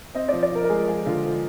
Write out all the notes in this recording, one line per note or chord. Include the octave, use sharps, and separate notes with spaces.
C4 D#5
F3 D5
D5
F3 A#4
A#4
G#3 G#4
F3 G#4
D3 F4
F3